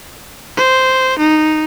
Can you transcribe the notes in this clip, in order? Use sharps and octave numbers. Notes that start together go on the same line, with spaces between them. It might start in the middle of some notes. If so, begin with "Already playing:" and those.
C5
D#4